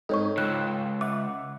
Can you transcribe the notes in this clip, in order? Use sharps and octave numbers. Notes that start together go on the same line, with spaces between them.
G#2 C4 D#4 A4 C#5 C#6
C#2 G5 E6 F#6
E5 F#5 D6